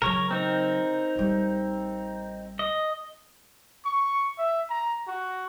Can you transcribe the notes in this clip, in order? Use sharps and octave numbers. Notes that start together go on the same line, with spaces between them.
C#3 F#3 A#4 C#5
C4 D#4 A#4
A1 G3
D#5
C#6
E5
A#5
F#4